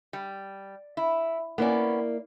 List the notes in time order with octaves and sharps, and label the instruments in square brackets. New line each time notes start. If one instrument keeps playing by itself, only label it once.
[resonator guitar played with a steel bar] G3
E4
[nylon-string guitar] A#3 E4 D5 [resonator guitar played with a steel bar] B3 C#4